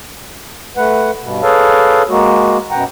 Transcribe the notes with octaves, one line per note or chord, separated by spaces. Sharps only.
A3 B4 F#5
G2 B2
G#4 A4 B4 C#5 F5 A5
G#3 A#3 F#4
F#2 B2 F#5 G5 A#5